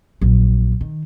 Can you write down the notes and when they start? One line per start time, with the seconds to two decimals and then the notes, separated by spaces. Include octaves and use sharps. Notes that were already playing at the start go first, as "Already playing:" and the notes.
0.21 A#1 F#3
0.81 D#3